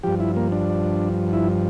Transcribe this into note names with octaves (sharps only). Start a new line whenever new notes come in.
G2 F3 G4
E4
A#3
D4
E4